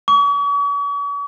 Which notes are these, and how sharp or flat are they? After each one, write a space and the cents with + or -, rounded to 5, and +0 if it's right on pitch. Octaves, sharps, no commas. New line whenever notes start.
C#6 +45